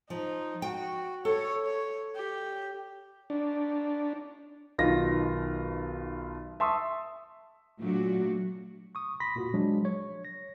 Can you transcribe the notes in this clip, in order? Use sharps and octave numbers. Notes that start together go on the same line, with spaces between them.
F3 D#4
F#4 G5
A4 C#5
C#5
G4
D4
B1 B2 D#3 F4 A#6
E5 A5 C6 C#6 D#6 E6
A#2 F#3 A3 D4 F#4
C#6 D#6
B5 C6 A#6 B6
A#2 F#4
F3 F#3 G#3 D4
C#5
A#6